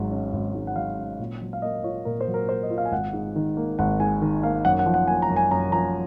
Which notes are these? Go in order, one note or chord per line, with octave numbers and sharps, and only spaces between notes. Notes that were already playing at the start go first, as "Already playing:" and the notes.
Already playing: G#1 G#2 F#3
C#4
G#1
G#2
F#5
F#3 F5
C#4
A#2
F#3
F5
A#3 D#5
F4 C#5
A#2 A#4
C5
F#3
A#4
A#3 C5
D#5
F4
F5
G#5
G#1 F#5
G#2
D#3
A#3
G#1 F#5
G#2 G#5
D#3
A#3 F5
F#2 F#5
F#5
F3
F#5
A#3 G#5
A#5
F#2
G#5
F#2 A#5
F3 A#5